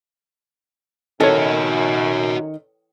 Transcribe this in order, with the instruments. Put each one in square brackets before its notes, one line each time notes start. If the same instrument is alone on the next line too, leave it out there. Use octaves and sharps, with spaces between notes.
[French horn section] F#2 [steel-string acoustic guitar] D#3 [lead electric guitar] F#4 D#5 [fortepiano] A4 C#5